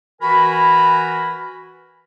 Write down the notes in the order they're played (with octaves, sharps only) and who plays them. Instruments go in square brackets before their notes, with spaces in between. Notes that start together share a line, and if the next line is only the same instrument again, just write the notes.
[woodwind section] E3 F#4 A#4 G#5 B5